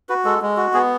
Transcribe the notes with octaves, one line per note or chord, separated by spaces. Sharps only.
F#4 B4
G#3 A4
G#3
F#4
B3 G#4